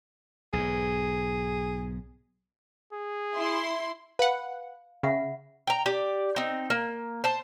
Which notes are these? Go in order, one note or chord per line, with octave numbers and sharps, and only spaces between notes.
B1 G#2 G#4
G#4
E4 C6
B4 F5 F#5
C#3 E5 F#5 B5
G5 A#5
G4 D5
C4 D#4
A#3
C5 A5